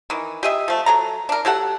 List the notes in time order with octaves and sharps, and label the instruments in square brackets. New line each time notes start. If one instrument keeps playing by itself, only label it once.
[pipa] D#3 E3
G4 G#4 D#5 E5
F3 A3
F#3 A4 A#5
D4 A#4
F#3 G4 A4 F#5